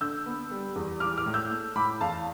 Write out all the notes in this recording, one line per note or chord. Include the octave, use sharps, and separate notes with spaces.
D3 E6 G6
B3
G3
E2
E3 D6 F6
D6 F6
A2
E6 G6
A3
A2 B5 D6
E2 F5 A5